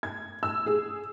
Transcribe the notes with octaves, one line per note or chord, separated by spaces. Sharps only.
G#6
E6
G#4